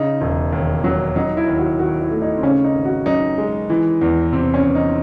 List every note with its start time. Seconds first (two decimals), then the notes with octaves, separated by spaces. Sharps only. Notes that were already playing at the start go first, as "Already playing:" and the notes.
Already playing: C#3 D#4
0.21 E1
0.52 D#2
0.84 F#3
1.16 F#3 D#4
1.37 E4
1.48 D#2
1.58 F#4
1.79 D#3 F#4
2.01 E4
2.11 A3
2.22 D#4
2.37 C4
2.43 C#3 C#4
2.64 D#4
2.75 G#1
2.85 F#4
3.06 F#2 D#4
3.38 G#3
3.70 E3
4.01 E2
4.33 C3 C4
4.54 C#4
4.65 E2
4.75 D#4